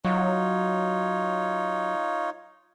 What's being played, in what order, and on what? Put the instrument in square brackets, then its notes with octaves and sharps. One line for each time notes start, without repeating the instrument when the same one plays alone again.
[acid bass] F#3 [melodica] D#4 F4 C#5